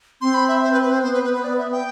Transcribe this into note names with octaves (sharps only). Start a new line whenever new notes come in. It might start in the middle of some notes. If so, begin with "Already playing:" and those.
C4 C6
B5
E5
C5
B4
B4
C5
B3 C5
B4
B4
B4
D5
E5
G5